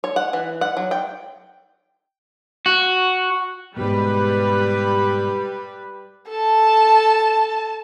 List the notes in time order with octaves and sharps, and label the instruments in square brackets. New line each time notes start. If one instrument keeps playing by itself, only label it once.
[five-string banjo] C#5
F#5
E3
F#5
F#3
G5
[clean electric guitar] F#4
[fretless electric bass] G#2 B2 [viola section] G3 B4
[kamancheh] A4 A5